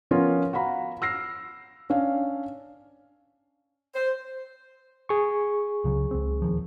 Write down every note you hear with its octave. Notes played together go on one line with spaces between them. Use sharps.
F3 B3 C#4 F4 A#4
F#4 F5 A#5 B5
E6 F6 A#6 C7
C#4 D4 F5
C5
G#4 C#6
C#2 C#3 F#3
C#2 C4
D#1 D#3 F3